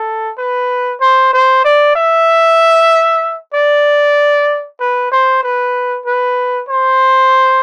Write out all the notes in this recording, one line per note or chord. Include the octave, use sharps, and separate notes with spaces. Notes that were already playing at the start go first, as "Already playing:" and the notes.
Already playing: A4
B4
C5
C5
D5
E5
D5
B4
C5
B4
B4
C5